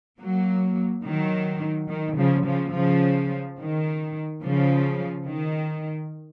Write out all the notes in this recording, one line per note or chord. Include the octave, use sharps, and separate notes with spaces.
F#3 A#3
D#3 F#3
D#3
C#3 F3
C#3 F3
C#3 F3
D#3
C#3 F3
D#3